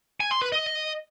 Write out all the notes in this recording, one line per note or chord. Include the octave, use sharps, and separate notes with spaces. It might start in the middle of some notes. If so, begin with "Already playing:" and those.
G#5
C6
B4
D#5